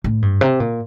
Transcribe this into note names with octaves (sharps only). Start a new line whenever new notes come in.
A2
G2
C3
A#2